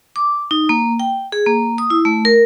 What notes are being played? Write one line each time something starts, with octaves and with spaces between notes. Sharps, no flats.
D6
D#4
A#3
G5
G#4
A#3
D#6
E4
A3
A#4